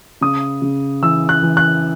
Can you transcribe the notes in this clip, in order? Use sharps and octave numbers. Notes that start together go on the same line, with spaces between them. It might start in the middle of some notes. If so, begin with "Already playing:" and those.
C#3 D#6
C#3
E3 E6
F#6
E3
F#6